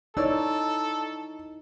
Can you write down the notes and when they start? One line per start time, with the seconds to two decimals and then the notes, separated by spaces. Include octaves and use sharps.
0.17 D#4 E4 A4 C#5 D5 E6